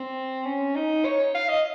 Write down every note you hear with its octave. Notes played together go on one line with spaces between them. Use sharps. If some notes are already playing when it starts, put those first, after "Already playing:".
Already playing: C4
C#4
D#4
C#5
F5
D#5